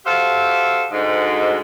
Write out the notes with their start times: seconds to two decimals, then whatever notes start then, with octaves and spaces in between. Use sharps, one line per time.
0.05 F#4 G4 A4 C5 E5 F5
0.91 D2 G#2